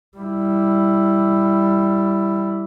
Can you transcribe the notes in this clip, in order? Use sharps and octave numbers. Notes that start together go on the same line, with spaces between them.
G3 E4